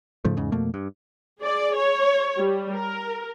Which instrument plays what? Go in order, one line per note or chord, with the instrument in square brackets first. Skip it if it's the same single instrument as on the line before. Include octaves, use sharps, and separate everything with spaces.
[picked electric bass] G#2 C#3 F3 A3
E2 G#2 C#3
F2 B2 A3 A#3
G2
[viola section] G#4 D5
C#5
G3
A#4